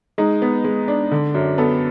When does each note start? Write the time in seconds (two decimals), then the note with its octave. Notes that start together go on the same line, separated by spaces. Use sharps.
0.18 G#3 D#4
0.42 B3
0.64 G#3
0.88 D4
1.11 D3
1.34 F#2
1.58 B3 A4